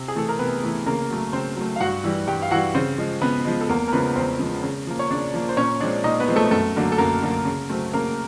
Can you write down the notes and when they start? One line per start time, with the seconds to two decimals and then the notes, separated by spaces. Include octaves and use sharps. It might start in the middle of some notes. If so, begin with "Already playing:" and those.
Already playing: C3
0.08 G#4
0.15 E3 A3 A4
0.29 A#4
0.39 C3 B3 B4
0.63 E3 A3
0.86 C#3 A#3 A#4
1.10 F#3 A3
1.33 C#3 C4 C5
1.56 F#3 A3
1.76 F5
1.80 G2 F#4 F#5
2.04 E3 G3
2.27 G2 G4 G5
2.42 F5
2.51 E3 G3 F#4 F#5
2.74 C#3 C4 C5
2.98 F3 G#3
3.21 C#3 B3 B4
3.45 F3 G#3
3.61 A4
3.69 E2 A#3 A#4
3.88 A#4
3.93 C#3 F3 G#3 B3 B4
4.16 E2 C4 C5
4.39 C#3 F3 G#3
4.63 C#3
4.87 F3 A#3
4.99 C#5
5.10 C#3 D4 D5
5.34 F3 A#3
5.49 C5
5.57 A#2 C#4 C#5
5.80 F3 G#3 C4 D4 D5
6.04 A#2 D#4 D#5
6.20 B3 B4
6.28 F3 G#3 C4
6.36 A3 A4
6.51 F#2 A3 A4
6.76 D3 F#3 A#3
6.92 A4
6.98 F#2 A#3 A#4
7.23 D3 F#3 A#3
7.45 C#3
7.70 F#3 A3 C4
7.93 C#3 A#3 A#4